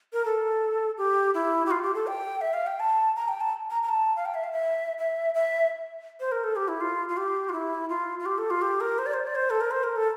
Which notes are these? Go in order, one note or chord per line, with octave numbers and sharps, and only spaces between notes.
A#4
A4
G4
E4
G4
F4
G4
A4
G5
E5
F5
G5
A5
A#5
G5
A5
A#5
A#5
A5
F5
G5
E5
F5
E5
E5
E5
C5
A#4
A4
G4
E4
F4
F4
G4
F4
E4
F4
F4
G4
A4
F4
G4
A#4
C5
D5
C5
D5
C5
A4
A#4
C5
A#4
A4